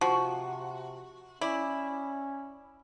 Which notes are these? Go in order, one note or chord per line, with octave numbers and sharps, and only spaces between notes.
C3 F3 F#4
C#4 E4 D5